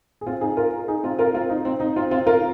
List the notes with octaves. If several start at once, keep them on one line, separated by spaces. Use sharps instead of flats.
G#4
C4 F4
D#4 G#4
F4 A#4
D#4 G#4
C4 F4
F4 A#4
C4 F4
D#4
C4
D#4
C4 F4
C4 F4
F4 A#4